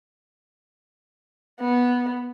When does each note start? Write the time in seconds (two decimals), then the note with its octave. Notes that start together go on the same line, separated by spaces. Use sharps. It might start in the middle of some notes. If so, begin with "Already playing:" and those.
1.60 B3